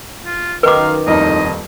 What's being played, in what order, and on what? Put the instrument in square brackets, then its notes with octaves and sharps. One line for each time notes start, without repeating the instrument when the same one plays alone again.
[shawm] F4
[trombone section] F#2 D#3 [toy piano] B4 D6 [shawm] F5
[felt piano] D#1 F2 A#4 [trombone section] A2 D#4 [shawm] D#5